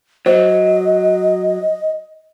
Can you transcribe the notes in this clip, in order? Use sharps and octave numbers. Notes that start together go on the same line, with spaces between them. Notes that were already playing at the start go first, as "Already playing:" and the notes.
F#3 C5 D#5